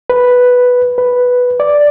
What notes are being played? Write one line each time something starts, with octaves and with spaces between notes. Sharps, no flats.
B4
B4
D5